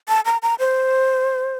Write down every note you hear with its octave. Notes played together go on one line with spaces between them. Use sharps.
A5
A#5
A#5
C5